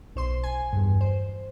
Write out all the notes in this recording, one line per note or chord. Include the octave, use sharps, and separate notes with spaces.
B1 C5 C6
G#5
E2 G2
C5